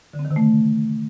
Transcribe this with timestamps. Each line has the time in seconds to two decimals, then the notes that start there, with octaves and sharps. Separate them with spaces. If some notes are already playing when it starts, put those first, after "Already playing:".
0.13 D3
0.19 C4
0.25 D#3
0.31 C3
0.36 A3